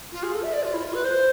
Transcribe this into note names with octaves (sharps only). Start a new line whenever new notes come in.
F4
G#4
A4
E5
D5
F4
E4
F4
B4
C5